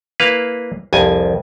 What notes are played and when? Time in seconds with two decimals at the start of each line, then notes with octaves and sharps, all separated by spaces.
0.20 A#3 E4 B4 F5
0.93 C2 F2 G#5